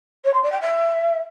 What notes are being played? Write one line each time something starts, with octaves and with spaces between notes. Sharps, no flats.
C#5
C6
D5
G5
E5